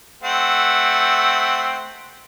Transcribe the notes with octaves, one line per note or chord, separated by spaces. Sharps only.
A3 C4 F#5